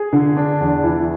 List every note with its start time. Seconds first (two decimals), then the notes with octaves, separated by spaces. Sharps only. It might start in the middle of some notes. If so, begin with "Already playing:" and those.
Already playing: G#4
0.13 D3
0.37 D4
0.60 E2
0.83 E3